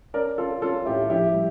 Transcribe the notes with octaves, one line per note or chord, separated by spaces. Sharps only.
C#4 A#4 D5
C#4 F4 A4
C#4 F4 A4
A2 E4 G4
A#1 E4 G4
G3